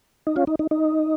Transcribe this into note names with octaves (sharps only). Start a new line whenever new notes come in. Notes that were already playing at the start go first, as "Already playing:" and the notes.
D#4
C#4 F4
D#4
D#4
D#4